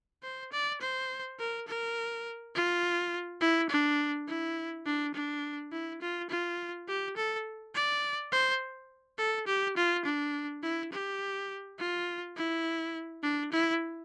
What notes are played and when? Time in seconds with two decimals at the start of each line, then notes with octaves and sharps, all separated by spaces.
0.23 C5
0.52 D5
0.81 C5
1.39 A#4
1.67 A#4
2.55 F4
3.41 E4
3.70 D4
4.27 E4
4.86 D4
5.14 D4
5.72 E4
6.01 F4
6.29 F4
6.88 G4
7.17 A4
7.74 D5
8.32 C5
9.18 A4
9.47 G4
9.77 F4
10.05 D4
10.63 E4
10.92 G4
11.79 F4
12.36 E4
13.23 D4
13.52 E4